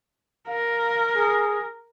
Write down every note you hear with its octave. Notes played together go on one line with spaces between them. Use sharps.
A#4 F5
G#4